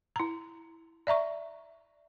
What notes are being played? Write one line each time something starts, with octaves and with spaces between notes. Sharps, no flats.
E4 A#5
D5 E5 A#5 C#6